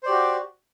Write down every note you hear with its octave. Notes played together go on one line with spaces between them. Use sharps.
F#4 G4 C5 D5